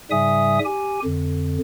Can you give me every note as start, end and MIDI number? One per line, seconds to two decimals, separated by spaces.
0.11 0.59 44
0.11 0.59 49
0.11 0.59 55
0.11 0.59 76
0.11 0.59 80
0.11 0.59 87
0.65 1.00 67
0.65 1.00 80
1.04 1.58 41
1.04 1.58 50